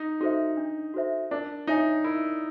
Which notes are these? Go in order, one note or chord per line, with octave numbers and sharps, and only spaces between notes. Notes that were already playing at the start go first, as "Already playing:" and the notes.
Already playing: D#4
D#4 F#4 A4 C5 E5
D4
F#4 A4 C5 E5
D4 A#4
D#4 C#5 E5 G#5
E4 A#4